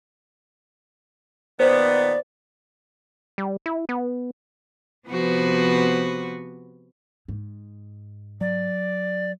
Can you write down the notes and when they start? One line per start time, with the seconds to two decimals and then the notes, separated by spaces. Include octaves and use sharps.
1.60 A#2 D#3 B3 C5 D5
3.38 G3
3.66 E4
3.89 B3
5.08 C3 F3 B3 F#4 B4
7.28 G#2
8.41 F#3 D5